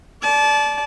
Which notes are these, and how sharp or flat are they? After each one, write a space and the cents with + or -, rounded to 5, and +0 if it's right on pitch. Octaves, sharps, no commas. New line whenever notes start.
D5 -10 A5 -25